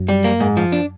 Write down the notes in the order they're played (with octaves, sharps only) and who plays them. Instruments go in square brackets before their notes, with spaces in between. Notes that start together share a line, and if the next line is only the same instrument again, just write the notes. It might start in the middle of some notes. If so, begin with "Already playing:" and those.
Already playing: [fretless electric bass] F#2
[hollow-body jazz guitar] G3
A#3
G#2
F3
D4